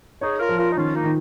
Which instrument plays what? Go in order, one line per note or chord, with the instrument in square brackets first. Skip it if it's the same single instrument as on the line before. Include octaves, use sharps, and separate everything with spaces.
[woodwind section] D#4 G#4 [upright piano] C#5
[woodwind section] F4 A#4
[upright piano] F3
[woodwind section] F4 A#4
D#4
[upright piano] D#3 [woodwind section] C#4 F4
[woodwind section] A#3 D#4
[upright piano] D#3